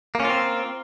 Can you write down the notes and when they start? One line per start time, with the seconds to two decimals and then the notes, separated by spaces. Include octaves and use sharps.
0.15 A#3
0.20 C#4
0.25 F4
0.29 C4